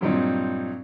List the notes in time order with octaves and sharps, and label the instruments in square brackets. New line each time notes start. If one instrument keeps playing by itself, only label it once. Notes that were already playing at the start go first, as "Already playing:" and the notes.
[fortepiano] G2 A#2 F#3 G3 C4 D#4